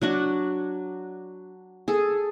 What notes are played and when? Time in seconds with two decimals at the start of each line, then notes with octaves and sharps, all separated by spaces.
0.01 F#3 D4 F#4
1.88 G#4 A4